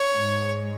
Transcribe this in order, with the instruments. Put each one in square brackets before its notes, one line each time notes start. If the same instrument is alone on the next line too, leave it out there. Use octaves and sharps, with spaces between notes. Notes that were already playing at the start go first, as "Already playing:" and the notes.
Already playing: [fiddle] C#5
[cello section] G#2 G#3